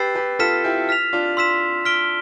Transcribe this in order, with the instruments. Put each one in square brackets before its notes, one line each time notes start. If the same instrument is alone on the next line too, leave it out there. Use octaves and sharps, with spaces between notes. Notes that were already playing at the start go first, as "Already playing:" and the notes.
Already playing: [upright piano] G4 B4 [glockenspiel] E6 A6 C7 E7
[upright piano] G4 B4
[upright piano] F4 A4 [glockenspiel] F6 B6 E7
[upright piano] E4 G4
[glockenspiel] F6 B6 F7
[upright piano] D4 F4
[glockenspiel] C6 E6 B6 E7
F6 B6 D7 G7